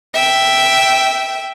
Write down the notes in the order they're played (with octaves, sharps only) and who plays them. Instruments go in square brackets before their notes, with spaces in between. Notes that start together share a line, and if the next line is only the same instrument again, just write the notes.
[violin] E5 G5